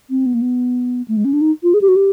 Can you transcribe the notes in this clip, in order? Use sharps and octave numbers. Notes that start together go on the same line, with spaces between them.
C4
B3
A#3
B3
A3
G#3
C#4
D4
D#4
F4
G#4
G4
F#4
G4